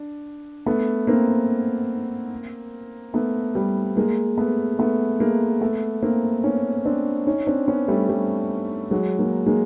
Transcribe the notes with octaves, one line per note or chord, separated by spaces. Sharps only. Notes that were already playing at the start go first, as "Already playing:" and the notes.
Already playing: D4
A3 B3
A#3 C4
A3 B3
G3
G#3 A#3
A3 B3
A3 B3
G#3 A#3
A3 B3
A#3 C4
B3 C#4
C4 D4
C#4 D#4
C4 D4
B3 C#4
G3 A3
G3
F#3 G#3
G#3 A#3
G#3 A#3